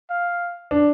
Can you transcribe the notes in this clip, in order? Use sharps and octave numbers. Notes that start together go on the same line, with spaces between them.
F5
D4